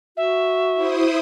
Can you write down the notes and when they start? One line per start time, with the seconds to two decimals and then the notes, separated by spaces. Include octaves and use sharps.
0.17 F#4 E5
0.74 E4 C5 D#6